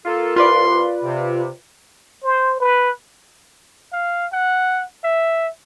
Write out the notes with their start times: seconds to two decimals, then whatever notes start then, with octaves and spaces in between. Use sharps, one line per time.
0.06 A#3 F4 A4
0.36 C2 F4 B4 D5 C6
1.03 C3
2.23 C5
2.60 B4
3.93 F5
4.33 F#5
5.04 E5